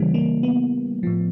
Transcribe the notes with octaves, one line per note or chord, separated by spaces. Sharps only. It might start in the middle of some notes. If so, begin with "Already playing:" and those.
Already playing: C#3 E3 G3 A#3
A#3
B3
A2 F3